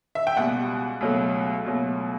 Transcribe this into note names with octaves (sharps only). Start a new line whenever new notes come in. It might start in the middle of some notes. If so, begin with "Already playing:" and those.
E5
G5
C#2 B2 G3 F#5
C#2 B2 F#3 A3
C#2 B2 F#3 A3